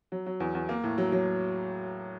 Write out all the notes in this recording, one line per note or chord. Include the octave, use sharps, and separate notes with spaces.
F#3
F#3
E2
E2
A#3
A2
F#3
F#3